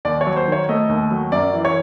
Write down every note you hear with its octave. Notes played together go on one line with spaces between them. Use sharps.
D#2 D5
C#5
F#3
C5
D#3 C#5
A3 D#5
D#2
F#3
F#2 D5
E3
C#5